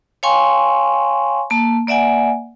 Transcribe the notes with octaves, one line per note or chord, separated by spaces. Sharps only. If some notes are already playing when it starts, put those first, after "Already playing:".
C#5 F5 G5 G#5 C6 C#6
A#3 A5
A#3 D5 E5 F#5 G#5